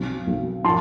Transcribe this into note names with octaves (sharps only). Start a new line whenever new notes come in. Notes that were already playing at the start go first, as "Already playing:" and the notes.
Already playing: B1 C4
B1
F3 A5 C6